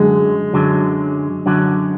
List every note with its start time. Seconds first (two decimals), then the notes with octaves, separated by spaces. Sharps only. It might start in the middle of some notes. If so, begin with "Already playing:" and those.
Already playing: F#2 D3 F#3 G#3
0.54 F#2 D3 F#3
1.46 F#2 D3 F#3